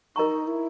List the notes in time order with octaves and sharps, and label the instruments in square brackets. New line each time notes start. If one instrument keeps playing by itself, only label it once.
[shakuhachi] D#4 [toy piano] A#4 D#5 A#5 C#6
[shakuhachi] E4